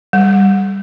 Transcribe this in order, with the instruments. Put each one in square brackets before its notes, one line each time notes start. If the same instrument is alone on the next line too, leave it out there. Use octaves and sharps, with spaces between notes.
[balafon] G3